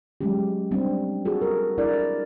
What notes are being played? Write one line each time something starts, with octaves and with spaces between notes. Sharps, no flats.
F#3 G#3 A3 C#4 G4
G3 C4 D4
F#4 G#4 A4
A#4
D4 E4 A#4 D5